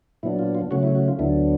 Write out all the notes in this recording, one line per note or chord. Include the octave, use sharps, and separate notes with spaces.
A#2 F#3 B3 D4 E4
F4
F4
C#3 F#3 A3 C#4 F#4
E4
F#4
F4
D2 D3 F#3 B3 D4 E4